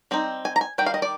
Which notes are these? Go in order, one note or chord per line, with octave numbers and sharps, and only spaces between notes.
G3 C4 D#4
G#5
A#5
G#5
D#3 G3 G5
F5
D#5
D5